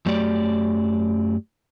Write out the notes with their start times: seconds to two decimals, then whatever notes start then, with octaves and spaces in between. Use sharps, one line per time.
0.06 F#2 F#3 A3 G4 D5